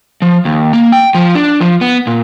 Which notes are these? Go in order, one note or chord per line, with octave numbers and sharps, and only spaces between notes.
F3
D#2
A#3
G5
F3
D4
F3
B3
A#2